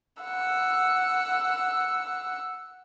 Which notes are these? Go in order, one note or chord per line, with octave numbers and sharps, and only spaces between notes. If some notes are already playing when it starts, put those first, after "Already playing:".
F#5 E6